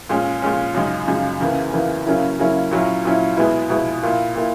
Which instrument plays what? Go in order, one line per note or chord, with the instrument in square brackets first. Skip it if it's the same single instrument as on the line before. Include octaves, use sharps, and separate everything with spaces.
[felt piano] A#2 G#3 C#4
A#2 G#3 C#4
F#2 C#3 G#3 D#4
F#2 C#3 G#3 D#4
E2 C#3 E3 A#3
E2 C#3 E3 A#3
C#3 F#3 A#3 C#4 E4
C#3 F#3 A#3 C#4 E4
A#2 F#3 C#4 E4
A#2 F#3 C#4 E4
B2 G#3 B3 E4
B2 G#3 B3 E4
A#2 A#3 E4
A#2 A#3 E4